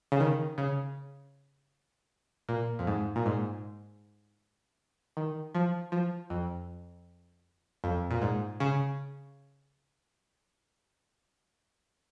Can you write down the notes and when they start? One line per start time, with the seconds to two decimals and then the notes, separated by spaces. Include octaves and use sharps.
0.12 C#3
0.20 D#3
0.58 C#3
2.49 A#2
2.79 F2
2.87 G#2
3.16 A#2
3.26 G#2
5.17 D#3
5.55 F3
5.92 F3
6.30 F2
7.84 F2
8.11 A#2
8.22 G#2
8.60 C#3